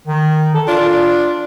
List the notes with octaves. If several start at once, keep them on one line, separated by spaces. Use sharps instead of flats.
D#3
A4
D4 F4